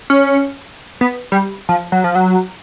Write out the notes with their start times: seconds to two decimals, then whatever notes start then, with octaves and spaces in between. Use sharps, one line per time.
0.10 C#4
1.01 B3
1.32 G3
1.69 F3
1.92 F#3
2.04 F3
2.15 F#3